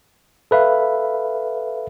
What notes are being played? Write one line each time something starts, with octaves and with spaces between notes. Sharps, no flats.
A4 B4 E5 F5